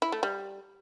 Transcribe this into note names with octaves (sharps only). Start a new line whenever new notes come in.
E4
A3
G3